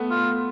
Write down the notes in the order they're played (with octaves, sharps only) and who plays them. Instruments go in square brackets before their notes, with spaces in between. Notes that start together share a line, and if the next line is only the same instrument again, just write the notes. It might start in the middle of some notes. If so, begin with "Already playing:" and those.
Already playing: [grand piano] A3 B3
[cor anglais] F4